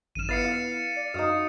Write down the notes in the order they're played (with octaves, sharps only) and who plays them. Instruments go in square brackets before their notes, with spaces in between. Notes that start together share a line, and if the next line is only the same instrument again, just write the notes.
[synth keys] G#1 F#2 F6 [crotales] D#7 E7
[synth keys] B3 E4 B4 [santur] F5 [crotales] A6 C7 C#7
[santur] F5
[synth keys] D5
[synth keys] F#2 F#4 D#6 [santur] D#4 F5